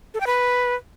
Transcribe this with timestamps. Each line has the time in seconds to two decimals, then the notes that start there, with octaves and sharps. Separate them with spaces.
0.14 A4
0.20 G5
0.27 B4